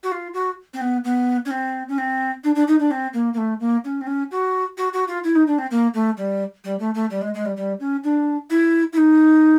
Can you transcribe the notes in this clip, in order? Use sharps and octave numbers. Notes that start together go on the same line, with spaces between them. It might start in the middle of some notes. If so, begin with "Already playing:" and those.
F#4
F4
F#4
C4
B3
B3
C#4
C4
C#4
C4
D4
D4
D#4
D4
C4
A#3
A#3
A3
A#3
C#4
C4
C#4
F#4
F#4
F#4
F4
E4
D#4
D4
C4
A#3
A3
G3
G3
A3
A3
G3
G#3
G#3
G3
G3
C#4
D4
E4
E4
D#4